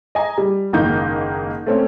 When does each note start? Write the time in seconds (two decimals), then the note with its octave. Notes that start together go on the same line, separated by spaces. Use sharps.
0.15 D#5 G#5 A#5
0.38 G3
0.73 F#1 G#2 D#3 A#3 D#4 G6
1.66 A3 C4 C#4